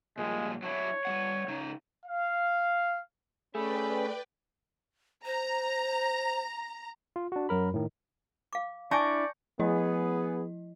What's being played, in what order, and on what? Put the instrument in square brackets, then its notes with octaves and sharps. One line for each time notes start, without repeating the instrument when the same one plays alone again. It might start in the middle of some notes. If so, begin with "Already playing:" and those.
[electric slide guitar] A#2 F3 G3 [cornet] G#3
[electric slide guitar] F#3 D4 E4 [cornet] C#5
[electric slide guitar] G3 G#3 F#5
C#3 D#4
[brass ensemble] F5
[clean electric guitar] A3 [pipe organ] C#4 B5 [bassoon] G#4 [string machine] B4 D5 G5
[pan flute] C5 [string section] A#5
[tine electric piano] F4
D4 F#4
F#2 F#3 A#4 B5
A2 D#3
[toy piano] F5 D6
[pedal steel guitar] D4 E4 [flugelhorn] D5 [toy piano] G#5 A5 [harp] C#6 G6 A#6
[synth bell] F3 E4 D#5 [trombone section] B3 G#4